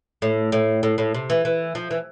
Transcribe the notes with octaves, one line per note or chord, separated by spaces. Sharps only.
A2
A2
A2
A2
C3
E3
E3
F3
E3